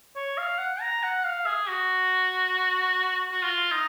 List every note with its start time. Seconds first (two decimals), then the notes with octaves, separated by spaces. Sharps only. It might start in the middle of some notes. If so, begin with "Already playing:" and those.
0.16 C#5
0.38 F5
0.59 F#5
0.81 A#5
1.03 F#5
1.24 F5
1.46 G#4
1.68 F#4
3.32 F#4
3.42 F4
3.71 D#4